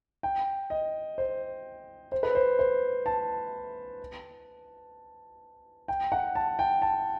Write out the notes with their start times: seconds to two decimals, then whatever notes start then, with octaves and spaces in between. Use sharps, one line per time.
0.23 G5
0.70 D#5
1.18 C5
2.12 C5
2.23 B4
2.35 C5
2.59 C5
3.06 A5
5.88 G5
6.12 F#5
6.35 A5
6.59 G5
6.82 A5